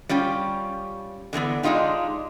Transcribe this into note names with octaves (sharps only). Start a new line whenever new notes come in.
G3 C#4 F4 G4
D3 E3 A#3 B3
G#3 D4 D#4 F4 G4